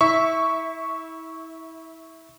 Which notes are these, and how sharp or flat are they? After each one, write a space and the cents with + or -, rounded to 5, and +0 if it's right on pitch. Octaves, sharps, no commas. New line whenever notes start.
E4 -30 E5 -10 C#6 +0